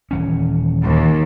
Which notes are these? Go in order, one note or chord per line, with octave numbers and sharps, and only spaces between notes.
D#1 E3 C#4
D#2